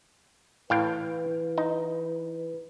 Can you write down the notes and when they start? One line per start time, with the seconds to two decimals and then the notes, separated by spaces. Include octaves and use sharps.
0.70 A2 E3 B4 F5 G5
1.58 D#4